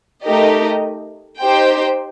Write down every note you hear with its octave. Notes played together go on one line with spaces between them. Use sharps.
A3 D#4 G4 A#4 D#5
D#4 G4 C5 G5